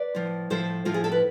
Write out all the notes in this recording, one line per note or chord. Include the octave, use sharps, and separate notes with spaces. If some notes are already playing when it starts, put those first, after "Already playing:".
Already playing: B4 D5
A2 F3
A2 F3 A4 C5
A2 F3 F4
G#4
A4
B4